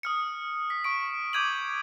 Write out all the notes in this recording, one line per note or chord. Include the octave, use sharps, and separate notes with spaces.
D#6 F6 C#7
B6
C#6 D7
D6 G6 G#6 D#7 F#7